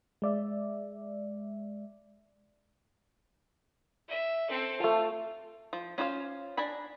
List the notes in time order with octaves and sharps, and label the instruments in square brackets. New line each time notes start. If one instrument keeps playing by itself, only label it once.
[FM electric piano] G#3 D5 E5
[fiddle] E5
C4 A4
[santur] A3 A5 [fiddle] F4
[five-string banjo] F3
C#4 F4 C5 D5 F5
D4 A#4 G#5 B5